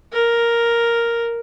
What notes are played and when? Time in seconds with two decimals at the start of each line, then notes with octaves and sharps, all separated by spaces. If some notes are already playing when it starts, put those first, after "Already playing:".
0.13 A#4